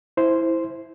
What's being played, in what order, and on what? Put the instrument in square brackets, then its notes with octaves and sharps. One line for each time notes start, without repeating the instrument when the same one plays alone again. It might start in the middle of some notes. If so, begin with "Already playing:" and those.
[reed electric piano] E4 C5